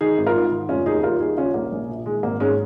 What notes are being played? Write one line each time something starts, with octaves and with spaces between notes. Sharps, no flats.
D#3 D#4 G#4
G#1
F4 A#4
G#2
D#3
F1 C#4 F4
D#2 D#4 G#4
D#2 F4 A#4
D#2 D#4 G#4
C#3 C#4 F4
A#1 A#3
A#1
A#2
D#3 G#3
G#1 A#3
G#2 G#3 C#4